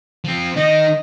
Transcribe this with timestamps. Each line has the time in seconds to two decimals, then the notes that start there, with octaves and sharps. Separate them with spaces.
0.24 F3 C4
0.56 D#3 D#4 D#5